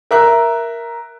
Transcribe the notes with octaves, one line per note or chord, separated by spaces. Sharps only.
A#4 E5 F#6